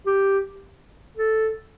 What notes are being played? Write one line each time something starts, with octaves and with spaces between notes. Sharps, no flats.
G4
A4